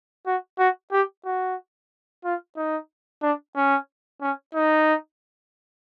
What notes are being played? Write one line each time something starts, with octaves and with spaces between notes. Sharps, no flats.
F#4
F#4
G4
F#4
F4
D#4
D4
C#4
C#4
D#4